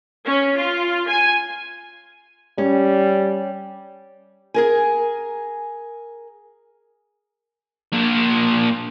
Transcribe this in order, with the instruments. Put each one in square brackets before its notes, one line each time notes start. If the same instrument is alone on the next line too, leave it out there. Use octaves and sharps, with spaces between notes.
[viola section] C#4
F4
G#5
[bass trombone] G3 [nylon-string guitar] C#4
[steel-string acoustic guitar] G#4 A#4 G#5
[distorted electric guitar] A#2 D4